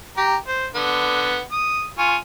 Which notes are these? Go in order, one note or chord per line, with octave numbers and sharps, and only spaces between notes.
G4 A#5
C5
D3 B3
D#6
F4 G#5 C#6